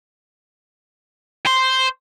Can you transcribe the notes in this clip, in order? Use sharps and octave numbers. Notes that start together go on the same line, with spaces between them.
C5